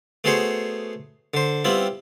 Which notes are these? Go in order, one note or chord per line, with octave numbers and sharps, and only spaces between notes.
A3 B3 F#4 G#4 C5 C#5
D3 C5
G3 B3 C4 E4 F4